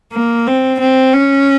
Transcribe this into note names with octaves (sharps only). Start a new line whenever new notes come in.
A#3
C4
C4
C#4